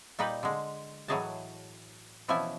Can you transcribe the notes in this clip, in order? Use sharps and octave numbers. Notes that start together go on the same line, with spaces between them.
A#2 G3 D#4 B4 G5
D3 G#3
A2 E3 F#3 G#4 D#5 A5
B2 E3 F3 C#4 E4 G#5